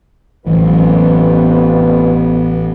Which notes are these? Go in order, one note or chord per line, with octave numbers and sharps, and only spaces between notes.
A1 F2 E3 F#3 B3